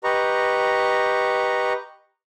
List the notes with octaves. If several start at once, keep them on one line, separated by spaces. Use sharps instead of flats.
G4 B4 D#5 A#5 C#6